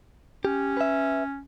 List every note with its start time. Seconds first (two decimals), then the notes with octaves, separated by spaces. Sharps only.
0.45 C#4 G4
0.77 B4 E5